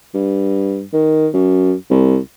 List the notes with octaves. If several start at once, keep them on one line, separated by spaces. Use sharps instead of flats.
G2
D#3
F#2
C2